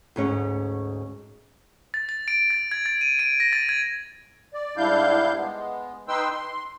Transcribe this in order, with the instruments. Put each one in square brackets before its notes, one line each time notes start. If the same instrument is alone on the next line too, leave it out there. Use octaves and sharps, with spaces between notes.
[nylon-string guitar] D2 G#2 C#4
[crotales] A6
A6
D7
A6
G#6
A6
D#7
D7
A#6
A6
G#6
[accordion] D5
G#2 G3 D4 E4 F5 G6
G#3 B3
D#4 B4 G5 C6 E6
C6